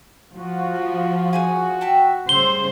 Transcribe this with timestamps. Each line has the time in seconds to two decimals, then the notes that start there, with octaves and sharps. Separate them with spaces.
0.36 F3 F#4
1.33 D#4 G#4 G#5
1.81 E5 G5 A5
2.29 C#3 G3 C5 C6 E6 G7